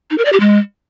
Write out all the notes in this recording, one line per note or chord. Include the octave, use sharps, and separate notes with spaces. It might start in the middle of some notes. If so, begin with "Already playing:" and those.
D#4
A#4
D5
G4
G#3